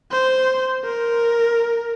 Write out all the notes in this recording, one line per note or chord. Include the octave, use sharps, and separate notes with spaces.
C5
A#4